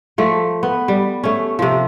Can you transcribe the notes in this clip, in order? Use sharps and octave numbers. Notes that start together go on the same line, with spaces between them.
F3 A3
B3
G3
A3 C#4
C3 F3